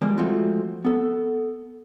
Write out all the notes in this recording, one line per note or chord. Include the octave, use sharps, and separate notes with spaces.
F3 G3 G#3 A#3
F3 G#3 A3 C4 F4 F#4
B3 A4